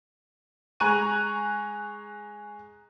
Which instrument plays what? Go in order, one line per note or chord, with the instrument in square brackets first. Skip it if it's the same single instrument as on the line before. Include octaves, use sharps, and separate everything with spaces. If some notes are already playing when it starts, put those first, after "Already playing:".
[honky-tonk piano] G#3 G#5 A#5 C#6 F#6 D#7